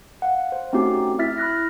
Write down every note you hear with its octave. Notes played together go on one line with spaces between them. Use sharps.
F5 F#5
C5
A3 C4 C#4 D#4 F#4 G4
E4 E5 F6 A6 B6
B5 F6 F#6 A#6